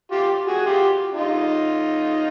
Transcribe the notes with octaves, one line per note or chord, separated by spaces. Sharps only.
F4 G4
F#4 G#4
F4 G4
D#4 F4